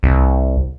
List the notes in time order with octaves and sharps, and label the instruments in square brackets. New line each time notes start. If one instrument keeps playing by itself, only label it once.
[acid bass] C2